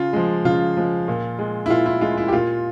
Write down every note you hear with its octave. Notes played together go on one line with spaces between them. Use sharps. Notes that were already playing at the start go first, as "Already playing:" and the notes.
Already playing: C#3 F4
F3 G#3
C#3 F4
F3 G#3
A#2
G#3
E4
A#2 F4
E4
G#3 F4
E4
G4
A#2 F4